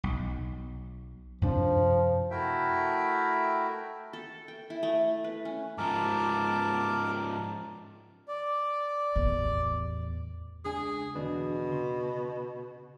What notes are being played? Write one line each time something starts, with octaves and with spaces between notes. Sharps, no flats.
B1
F#2 C3 F3 D4
A3 E4 F#4 A#4 E5 G5
A4
G5
E4
A3
B4
C#4
G#2 F3 A#4 A5 D6
D5
A1 E2
C#2 D4 G#4 G#5
E2 B2 D3 D4
C#3 C6